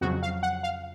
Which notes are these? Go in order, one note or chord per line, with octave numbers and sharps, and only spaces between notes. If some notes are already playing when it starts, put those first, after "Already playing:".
F2 C#3 F#3 F#4
F5
F#5
F5